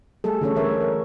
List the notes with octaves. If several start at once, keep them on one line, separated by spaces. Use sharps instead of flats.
G3 A3 G#4 A4
D3 E3 A3 C#4 A4 C#5
D3 G3 A#4 C#5 E5
A#4